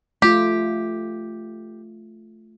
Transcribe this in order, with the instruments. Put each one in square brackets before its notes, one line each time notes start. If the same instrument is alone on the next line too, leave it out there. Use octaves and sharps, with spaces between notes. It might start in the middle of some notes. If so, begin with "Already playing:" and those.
[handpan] A3 F4 [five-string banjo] G4